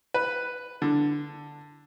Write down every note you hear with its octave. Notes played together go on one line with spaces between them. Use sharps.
B4
D3